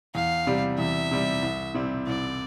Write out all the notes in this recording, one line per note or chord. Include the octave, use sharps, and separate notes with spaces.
E2 F5
C3 G3
E2 E5
C3 G3
C2
C3 G3 C4 E4
C2 D5